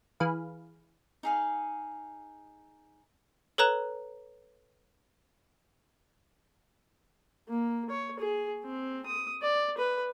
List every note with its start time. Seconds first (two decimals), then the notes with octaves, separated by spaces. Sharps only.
0.20 E3 G#4 B4 F5
1.23 D#4 G#4 F5
3.58 A4 B4 C#5 A#5 F#6 E7
7.49 A#3
7.90 C#5
8.20 G#4
8.65 C4
9.06 D#6
9.42 D5
9.78 B4